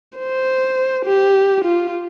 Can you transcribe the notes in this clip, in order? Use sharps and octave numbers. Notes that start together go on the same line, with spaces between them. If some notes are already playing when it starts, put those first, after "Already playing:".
C5
G4
F4